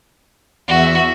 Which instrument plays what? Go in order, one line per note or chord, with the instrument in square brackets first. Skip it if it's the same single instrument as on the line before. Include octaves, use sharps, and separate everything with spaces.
[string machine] E2 E5 [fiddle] F#4